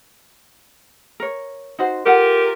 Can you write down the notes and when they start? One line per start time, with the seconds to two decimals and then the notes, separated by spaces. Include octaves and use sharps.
1.20 A#4 C#5
1.79 D#4 F#4 C5
2.06 F4 G4 A4 A#4 F#5